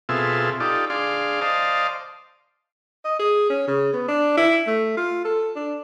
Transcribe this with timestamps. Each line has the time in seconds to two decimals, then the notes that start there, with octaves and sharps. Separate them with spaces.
0.09 B2 C4 F4 G#4 A4 E5
0.60 D#4 F4 G4 A4 D5
0.90 D4 G#4 D5 F5 C6
1.41 C5 D5 D#5 F5 A5
3.05 D#5
3.20 G#4
3.50 C#4
3.68 C#3
3.93 B3
4.08 D4
4.37 E4
4.67 A3
4.97 F4
5.25 A4
5.56 D4